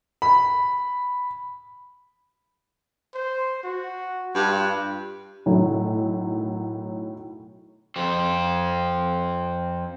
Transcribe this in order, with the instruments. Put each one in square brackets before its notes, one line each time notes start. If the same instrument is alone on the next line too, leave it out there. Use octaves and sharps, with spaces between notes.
[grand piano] B5
[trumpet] C5
F#4
[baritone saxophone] G2 [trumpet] F4
[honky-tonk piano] B1 A2 D#3 F#3
[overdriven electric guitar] F2 C4